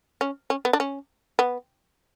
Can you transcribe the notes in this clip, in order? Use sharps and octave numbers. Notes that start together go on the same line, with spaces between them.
C#4
C#4
B3
D4
C#4
B3